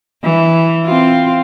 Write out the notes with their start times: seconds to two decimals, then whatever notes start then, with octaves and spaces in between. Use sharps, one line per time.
0.23 E3
0.85 C4 F4